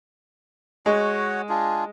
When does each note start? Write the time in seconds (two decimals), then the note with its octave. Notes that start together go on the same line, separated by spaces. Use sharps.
0.86 G#3 F#4 C#5 F#5
1.49 D4 F4 G#4